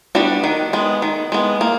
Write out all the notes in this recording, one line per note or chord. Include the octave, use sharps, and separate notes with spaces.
G3 B3 D4 F#4
D#3
G#3 B3
D#3
G#3 B3
A#3